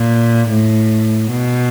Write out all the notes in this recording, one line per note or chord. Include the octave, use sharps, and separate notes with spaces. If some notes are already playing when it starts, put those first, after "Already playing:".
Already playing: A#2
A2
B2